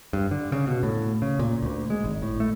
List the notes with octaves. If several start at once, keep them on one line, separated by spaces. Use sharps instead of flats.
G2
D3
C#3
B2
A2
C#3
A#2
D2
G#3
G#1
A2
A3